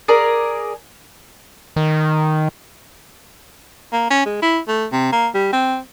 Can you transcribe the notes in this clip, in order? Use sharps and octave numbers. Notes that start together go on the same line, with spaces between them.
G#4 A#4 D5
D#3
A#3
C#4
G#3
E4
A3
C3
A#3
G3
C4